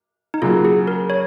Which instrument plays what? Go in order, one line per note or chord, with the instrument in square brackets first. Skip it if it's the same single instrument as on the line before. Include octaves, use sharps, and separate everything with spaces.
[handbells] D#4
[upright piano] C#3 F#3 A#3 [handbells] F4
[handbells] G#4
A#4
C#5